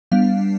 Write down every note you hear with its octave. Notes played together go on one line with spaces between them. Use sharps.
G3 B3 D4 F5